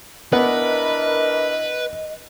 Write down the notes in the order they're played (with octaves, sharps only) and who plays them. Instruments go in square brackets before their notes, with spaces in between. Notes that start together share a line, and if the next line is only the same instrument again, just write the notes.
[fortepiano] B3 [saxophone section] D4 E4 A#4 [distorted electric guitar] B4 [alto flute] D#5